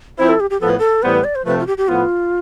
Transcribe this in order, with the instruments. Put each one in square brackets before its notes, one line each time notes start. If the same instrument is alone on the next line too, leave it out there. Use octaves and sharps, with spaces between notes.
[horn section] F3 C4 E4 [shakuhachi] C5
[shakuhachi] A4
G4
G4
[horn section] A2 F3 B3 [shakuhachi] A4
[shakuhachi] B4
A4
[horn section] A2 E3 G3 B3 [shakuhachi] C5
[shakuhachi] B4
D5
C5
[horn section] C3 F3 A3 [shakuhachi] B4
[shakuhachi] F4
G4
G4
[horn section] A2 F3 B3 [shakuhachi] F4